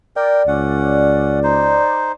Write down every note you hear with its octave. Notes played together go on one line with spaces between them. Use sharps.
A#4 D5 G5
C#2 C#4 F#5
D#4 C5